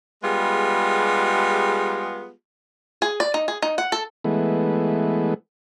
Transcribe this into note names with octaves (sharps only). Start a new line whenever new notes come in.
G3 G#3 B3 F4 G4 G#4
G#4
D5
D#4
G#4
D#4
F#5
A4
E3 G#3 A3 B3